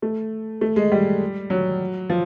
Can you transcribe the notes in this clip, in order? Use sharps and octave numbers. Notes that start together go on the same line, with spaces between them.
A3
A3
G#3
G3
F#3
F3